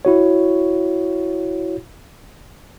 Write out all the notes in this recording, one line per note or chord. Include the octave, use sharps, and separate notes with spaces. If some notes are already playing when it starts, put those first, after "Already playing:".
E4 F#4 C#5